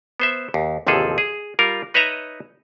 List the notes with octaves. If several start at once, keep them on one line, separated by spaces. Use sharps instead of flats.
B3 C5 E5
D#2
A1 D#2 C3 F3 G#4 A4
G#4
G3 F4 A#4
D#4 B4 C#5 D#5 E5 A#5